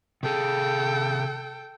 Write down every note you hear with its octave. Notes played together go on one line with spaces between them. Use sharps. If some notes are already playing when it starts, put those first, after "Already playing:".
C3 G#4 A4 G5